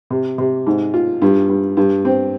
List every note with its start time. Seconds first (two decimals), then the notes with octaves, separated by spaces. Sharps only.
0.10 C3
0.38 C3
0.67 G#2
0.94 F4
1.22 G2
1.49 G2
1.77 G2
2.05 C4